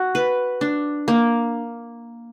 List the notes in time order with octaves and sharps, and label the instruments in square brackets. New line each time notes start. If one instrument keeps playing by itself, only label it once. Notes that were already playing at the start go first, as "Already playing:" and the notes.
Already playing: [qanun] F#4
B4
D4
A#3